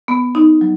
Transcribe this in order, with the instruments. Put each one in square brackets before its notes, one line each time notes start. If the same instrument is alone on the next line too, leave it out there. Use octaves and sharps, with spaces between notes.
[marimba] B3
D#4
F#3